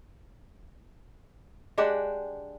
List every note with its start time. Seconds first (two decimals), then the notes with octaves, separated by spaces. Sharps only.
1.78 G#3 D4 G4 F#5